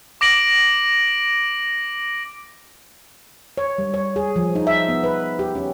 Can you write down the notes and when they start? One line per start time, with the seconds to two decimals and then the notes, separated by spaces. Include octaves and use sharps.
0.21 D6 A#6 D7 F#7
3.58 C#5
3.78 G3
3.94 C#5
4.16 G#4
4.36 F3
4.55 D#4
4.67 E5
4.89 B3
5.04 B4
5.39 G4
5.55 C#4